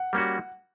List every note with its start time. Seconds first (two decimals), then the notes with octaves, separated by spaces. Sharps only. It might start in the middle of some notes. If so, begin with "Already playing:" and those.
Already playing: F#5
0.13 G3 A#3 C#4 F#4